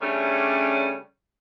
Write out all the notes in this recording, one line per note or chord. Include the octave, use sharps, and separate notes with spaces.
C#3 G3 A3 C#4 D4